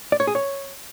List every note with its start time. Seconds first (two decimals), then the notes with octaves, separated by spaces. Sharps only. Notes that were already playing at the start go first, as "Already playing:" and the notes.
0.12 D5
0.20 C#5
0.27 G#4
0.35 C#5